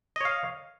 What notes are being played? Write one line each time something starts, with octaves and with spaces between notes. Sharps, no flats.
C#5 D#5 F5